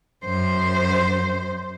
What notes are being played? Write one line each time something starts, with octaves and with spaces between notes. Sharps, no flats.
F#2 C5